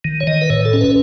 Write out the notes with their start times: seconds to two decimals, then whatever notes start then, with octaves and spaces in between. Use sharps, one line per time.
0.05 D#3
0.20 C#5
0.27 D#3 D#5
0.42 B4
0.50 A2 C#5
0.65 A4
0.73 C#4
0.81 B4